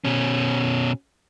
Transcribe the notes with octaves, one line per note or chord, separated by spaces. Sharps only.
B2 C#4